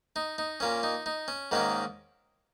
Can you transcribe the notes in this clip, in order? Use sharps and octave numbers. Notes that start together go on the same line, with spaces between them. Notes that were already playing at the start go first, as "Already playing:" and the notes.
D#4
D#4
A#2 A#3 C#4
D#4
D#4
C#4
G#2 D#3 A#3 C#4